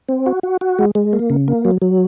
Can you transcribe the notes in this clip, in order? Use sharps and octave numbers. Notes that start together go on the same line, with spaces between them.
C4
F#4
F#4
F#4
G#3
G#3
A#3
C#3
A#3
F#3
F#3